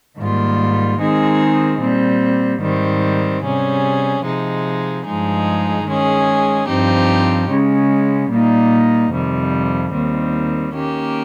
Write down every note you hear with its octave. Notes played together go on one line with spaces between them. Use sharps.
G#2 D#3 G3 A#3 F4
D#3 G#3 C4 D#4 G#4
A#2 G3 C4
G#2 D#3 G3 C4
C3 G3 C#4 G#4
C3 F3 G#3 D#4
G2 F3 G#3 D#4 G#4
D#3 G#3 C#4 G#4
G2 F3 C4 D#4 G4
C#3 G#3 C#4
A#2 G3 A#3 D#4
F2 C3 D#3 G3
D#2 D#3 G3 C4
D#3 A#3 C#4 G4